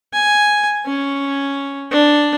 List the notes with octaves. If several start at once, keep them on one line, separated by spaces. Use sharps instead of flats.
G#5
C#4
D4